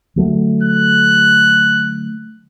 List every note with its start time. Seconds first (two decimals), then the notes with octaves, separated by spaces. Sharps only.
0.16 D3 F#3 A3
0.63 F#6